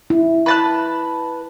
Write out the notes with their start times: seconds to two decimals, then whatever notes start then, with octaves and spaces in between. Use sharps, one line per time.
0.10 E4
0.46 B4 A5 F#6